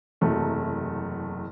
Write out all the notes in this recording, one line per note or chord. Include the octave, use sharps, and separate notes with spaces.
F#1 E2 C3 F#3 A3